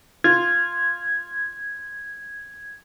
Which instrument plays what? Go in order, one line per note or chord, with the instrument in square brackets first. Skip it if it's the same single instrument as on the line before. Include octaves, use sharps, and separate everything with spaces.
[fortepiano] F4 [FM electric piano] G#6